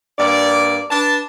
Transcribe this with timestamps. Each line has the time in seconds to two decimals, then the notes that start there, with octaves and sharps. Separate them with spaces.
0.19 G2 A#3 D5
0.90 D4 B4 A5